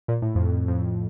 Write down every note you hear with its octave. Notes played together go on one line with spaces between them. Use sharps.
A#2
A2
F2
F2